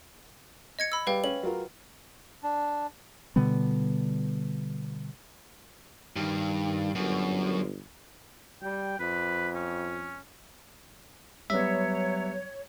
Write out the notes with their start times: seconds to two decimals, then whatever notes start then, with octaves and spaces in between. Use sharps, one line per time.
0.79 D#5 G#6 C#7
0.92 B5 E6
1.07 G3 B4 F5 G5
1.24 C#4 F#7
1.43 F#3 F4 A#4
2.43 D4
3.36 B2 D3 G3 B3
6.16 G2 D#3
6.95 G1 F#2
8.62 G3 G5
8.99 F2 B4
9.55 C#4
11.50 F#3 G3 B3 C#5 E5